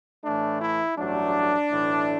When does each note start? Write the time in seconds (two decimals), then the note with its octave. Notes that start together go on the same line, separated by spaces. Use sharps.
0.24 A2 E3 A3 D4
0.61 E4
0.97 A1 G2 F#3 A3 D4
1.70 B1 A2 E3 A3